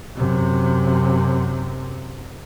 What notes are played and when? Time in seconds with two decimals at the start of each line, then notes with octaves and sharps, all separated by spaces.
0.16 F#2 C3